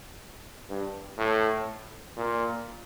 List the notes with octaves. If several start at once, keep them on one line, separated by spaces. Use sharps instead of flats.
G2
A2
A#2